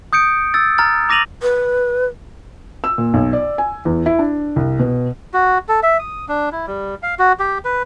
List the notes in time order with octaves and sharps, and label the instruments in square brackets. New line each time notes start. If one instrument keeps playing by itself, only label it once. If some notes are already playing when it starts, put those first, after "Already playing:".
[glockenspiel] D#6 G6 C#7 D7
E6 A6
A#5 F6 A6
A#5 D6 A#6 D#7 F7 F#7
[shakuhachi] B4
[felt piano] E6
A#2
B1
D5
G#5
E2
E4
D4
C2
B2
[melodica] F#4
A4
E5
D#6
D4
E4
G3
F5
F#4
G4
B4